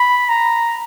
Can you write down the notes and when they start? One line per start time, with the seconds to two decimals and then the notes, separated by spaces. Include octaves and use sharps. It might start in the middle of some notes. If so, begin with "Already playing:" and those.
Already playing: B5
0.29 A#5